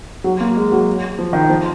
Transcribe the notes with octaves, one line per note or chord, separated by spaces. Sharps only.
F#3
A#3
G#3
F#3
F3
D#3
F3